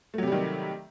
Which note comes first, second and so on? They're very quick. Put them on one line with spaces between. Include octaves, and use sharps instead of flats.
A3 F#3 C3 G3 D#3